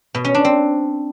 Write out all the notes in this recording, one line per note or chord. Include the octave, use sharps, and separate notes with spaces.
B2
C#4
D4
C4